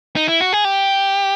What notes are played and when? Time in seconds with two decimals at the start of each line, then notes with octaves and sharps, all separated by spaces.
0.16 D#4
0.28 E4
0.41 F#4
0.53 G#4
0.65 G4